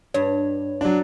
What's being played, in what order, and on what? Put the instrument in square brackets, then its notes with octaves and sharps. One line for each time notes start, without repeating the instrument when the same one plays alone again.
[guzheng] G2 [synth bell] C#5
[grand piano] F#3 D4